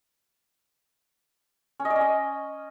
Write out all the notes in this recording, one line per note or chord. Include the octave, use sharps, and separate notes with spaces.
C#4
D#5
D5
C#4
D#5